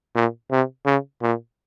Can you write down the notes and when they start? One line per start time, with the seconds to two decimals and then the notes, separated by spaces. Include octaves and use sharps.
0.15 A#2
0.51 C3
0.86 C#3
1.22 A#2